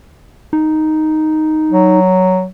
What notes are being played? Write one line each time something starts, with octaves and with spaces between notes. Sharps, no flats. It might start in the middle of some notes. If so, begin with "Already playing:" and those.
D#4
F#3